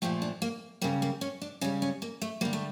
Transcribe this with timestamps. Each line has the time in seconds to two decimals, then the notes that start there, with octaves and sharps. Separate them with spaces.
0.02 A#2 F3 A3 G4
0.22 D4
0.42 A#3
0.81 C#3 G3 A#3
1.02 A#3
1.21 C#4
1.41 D4
1.61 C#3 G3 C#4
1.82 C#4
2.02 A#3
2.22 A3
2.41 D3 G3 A#3
2.53 A3